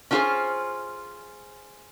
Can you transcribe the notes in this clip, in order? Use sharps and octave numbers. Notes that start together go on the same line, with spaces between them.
C#4 D4 F4 F#4 G#4 C5